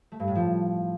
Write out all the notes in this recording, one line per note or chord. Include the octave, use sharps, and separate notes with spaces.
A3
G2
A2
F3